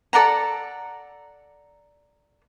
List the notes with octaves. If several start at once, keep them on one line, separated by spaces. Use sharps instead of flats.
A4 D5 F#5 A#5